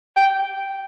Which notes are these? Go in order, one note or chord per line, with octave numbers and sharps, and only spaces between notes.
G5